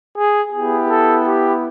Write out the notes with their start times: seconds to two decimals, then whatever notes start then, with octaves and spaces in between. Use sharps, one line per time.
0.15 G#4
0.52 B3 E4 G4 G#4
0.89 A4
1.26 G4